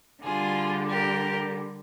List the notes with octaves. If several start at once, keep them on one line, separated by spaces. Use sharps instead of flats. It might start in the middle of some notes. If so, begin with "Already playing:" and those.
D3 G3 F4 G#4
G4 A#4